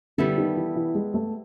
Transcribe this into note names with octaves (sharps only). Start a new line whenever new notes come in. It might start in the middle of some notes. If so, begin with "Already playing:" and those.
D3 G3 B3 E4 A4
D#3
E3
E3
G#3
A3